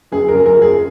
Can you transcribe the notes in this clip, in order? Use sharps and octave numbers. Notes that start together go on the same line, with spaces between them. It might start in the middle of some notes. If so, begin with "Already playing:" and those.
F#2 G#4
A#4
F#2
A#4
F3 G#4